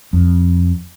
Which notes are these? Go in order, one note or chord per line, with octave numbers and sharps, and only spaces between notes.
F2